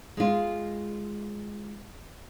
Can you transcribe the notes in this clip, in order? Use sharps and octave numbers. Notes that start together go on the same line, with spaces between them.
G#3 F4